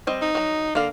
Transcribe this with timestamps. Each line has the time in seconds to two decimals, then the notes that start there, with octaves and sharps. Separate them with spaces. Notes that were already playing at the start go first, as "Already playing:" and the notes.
0.07 G3 C4 D#5
0.22 D#4
0.35 F#3 A#5
0.75 D3 A#3 F5